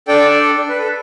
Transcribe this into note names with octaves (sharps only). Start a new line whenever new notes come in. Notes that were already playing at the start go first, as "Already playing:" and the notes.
D4 A4 D5 G5
B4
A4